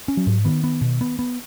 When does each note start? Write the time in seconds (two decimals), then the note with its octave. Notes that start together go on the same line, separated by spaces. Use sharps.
0.08 C#4
0.17 F#3
0.27 G#2
0.45 D#3 B3
0.64 B3
0.81 B2
1.01 B3
1.19 B3